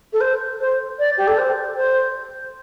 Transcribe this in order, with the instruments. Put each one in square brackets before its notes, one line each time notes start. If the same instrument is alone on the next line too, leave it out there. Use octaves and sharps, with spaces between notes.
[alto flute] A4
C5
C5
D5
G4
A4
C5
C5